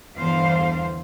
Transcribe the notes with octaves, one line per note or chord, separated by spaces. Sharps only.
E2 G2 D3 E3 C5 F5